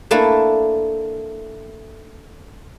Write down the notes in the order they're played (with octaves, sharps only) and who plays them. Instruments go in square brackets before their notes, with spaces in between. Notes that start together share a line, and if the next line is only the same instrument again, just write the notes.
[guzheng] A3 A#3 D4 E4 A4